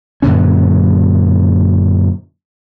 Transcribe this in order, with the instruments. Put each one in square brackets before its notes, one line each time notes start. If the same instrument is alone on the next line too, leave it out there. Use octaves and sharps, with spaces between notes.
[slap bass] F#2 A#2 D3 C#4